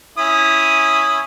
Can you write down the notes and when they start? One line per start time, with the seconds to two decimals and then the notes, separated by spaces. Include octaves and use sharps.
0.18 C#4 E4 D#6